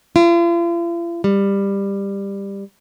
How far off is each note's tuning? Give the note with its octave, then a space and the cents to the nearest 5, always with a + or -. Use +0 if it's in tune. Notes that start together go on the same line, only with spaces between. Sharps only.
F4 -45
G3 +15